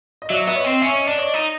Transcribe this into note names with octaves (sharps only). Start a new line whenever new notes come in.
D#5
F#3 D5 E5
B3 E5
C#5 D#5
C4
C#4 E5
D#5
D4 D5
C#5 D#5
D#4